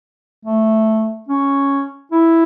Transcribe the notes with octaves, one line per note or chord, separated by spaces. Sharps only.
A3
C#4
E4